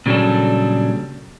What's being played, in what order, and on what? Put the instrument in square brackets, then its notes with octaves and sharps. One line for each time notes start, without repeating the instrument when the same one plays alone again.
[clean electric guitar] A#2 C#3 F#3 G3 D4 A4